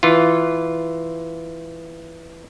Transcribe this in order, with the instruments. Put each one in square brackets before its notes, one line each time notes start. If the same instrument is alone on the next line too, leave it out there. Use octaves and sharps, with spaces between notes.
[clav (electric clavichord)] E3 F4